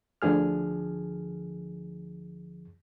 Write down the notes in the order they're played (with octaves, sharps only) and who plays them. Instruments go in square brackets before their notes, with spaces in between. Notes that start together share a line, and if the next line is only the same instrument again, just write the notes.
[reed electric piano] D2 D3 F3 G#4 F6